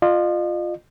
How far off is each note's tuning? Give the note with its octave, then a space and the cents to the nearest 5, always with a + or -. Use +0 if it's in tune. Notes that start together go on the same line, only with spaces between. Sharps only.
F4 +5 D#5 -40